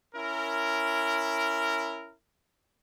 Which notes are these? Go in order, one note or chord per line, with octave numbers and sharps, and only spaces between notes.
C#4 E4 A#4